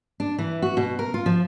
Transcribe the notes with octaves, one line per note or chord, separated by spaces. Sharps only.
D4
E3
F#4
B2
A#4
F4
F3